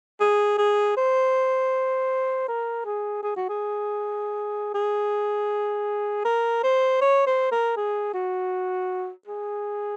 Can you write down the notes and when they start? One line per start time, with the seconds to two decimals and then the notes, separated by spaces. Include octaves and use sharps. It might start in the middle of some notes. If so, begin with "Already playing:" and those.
0.20 G#4
0.58 G#4
0.97 C5
2.48 A#4
2.85 G#4
3.23 G#4
3.36 F#4
3.49 G#4
4.74 G#4
6.25 A#4
6.63 C5
7.01 C#5
7.26 C5
7.52 A#4
7.77 G#4
8.14 F#4
9.27 G#4